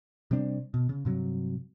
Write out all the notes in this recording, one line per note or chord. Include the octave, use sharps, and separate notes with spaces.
C3 G3 C4 D4
B2
C#3
G2 C3 F#3